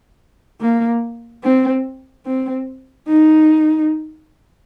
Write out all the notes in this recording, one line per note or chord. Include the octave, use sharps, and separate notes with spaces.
A#3
C4
C4
D#4